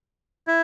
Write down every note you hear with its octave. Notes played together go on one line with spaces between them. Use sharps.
E4